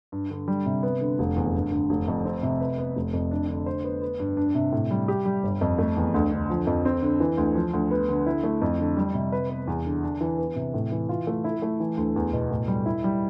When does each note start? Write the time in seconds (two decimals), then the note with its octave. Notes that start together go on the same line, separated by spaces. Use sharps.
0.12 G2
0.30 D3
0.48 G3
0.66 C3
0.83 B3
1.01 D3
1.19 F1
1.36 E2
1.54 G2
1.71 D3
1.90 F1
2.08 F2
2.25 C4
2.43 C3
2.60 B4
2.78 B3
2.96 F1
3.13 F2
3.31 D4
3.49 D3
3.66 C5
3.84 B3
4.02 B3
4.20 G2
4.37 D4
4.55 C3
4.72 A2
4.91 G3
5.08 G4
5.25 G3
5.43 G1
5.61 F2
5.79 A3
5.97 E2
6.14 D2
6.32 D3
6.50 F3
6.67 F2
6.85 C4
7.02 D3
7.20 E3
7.37 D2
7.55 F3
7.74 D2
7.91 B3
8.09 D3
8.26 E4
8.44 A3
8.62 F2
8.79 D3
8.97 G3
9.14 C3
9.32 B4
9.50 B3
9.67 E2
9.85 D3
10.03 D4
10.21 E3
10.38 B3
10.56 C3
10.74 A2
10.92 E3
11.09 F4
11.27 A3
11.44 E4
11.62 A3
11.80 E3
11.97 D2
12.16 E2
12.33 B2
12.51 A2
12.68 G3
12.86 E4
13.04 G3